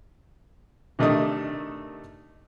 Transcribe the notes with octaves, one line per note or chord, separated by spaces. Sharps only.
C3 D#3 A3 D4 D#4 D#6